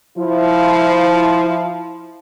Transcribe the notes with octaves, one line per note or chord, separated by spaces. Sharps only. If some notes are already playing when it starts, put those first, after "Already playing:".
F3 E4